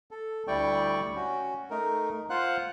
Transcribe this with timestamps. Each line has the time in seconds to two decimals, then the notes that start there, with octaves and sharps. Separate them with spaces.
0.11 A4
0.48 D2 G3 E4 D5 G5 C#6
1.16 C#4 F#4
1.70 A3 D#4 A#4
2.30 F4 C5 F5 F#5 F#6